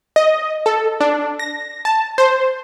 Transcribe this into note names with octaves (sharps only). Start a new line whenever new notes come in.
D#5
A4
D4
A#6
A5
C5